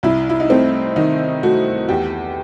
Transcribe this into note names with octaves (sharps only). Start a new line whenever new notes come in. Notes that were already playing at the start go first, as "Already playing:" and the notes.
C2 E4
E4
D#4
A3 C4
D#3 D#4
A3 F#4
E2 G4